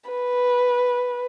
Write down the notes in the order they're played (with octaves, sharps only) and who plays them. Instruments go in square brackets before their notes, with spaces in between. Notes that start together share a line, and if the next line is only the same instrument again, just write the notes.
[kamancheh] B4